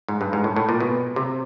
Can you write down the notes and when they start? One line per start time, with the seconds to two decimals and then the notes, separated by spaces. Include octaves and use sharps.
0.08 G#2
0.21 G2
0.33 G#2
0.44 A2
0.56 A2
0.69 A#2
0.80 B2
1.16 C3